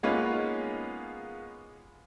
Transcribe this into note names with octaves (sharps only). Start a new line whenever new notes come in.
G#3 A#3 B3 C#4 D#4 F4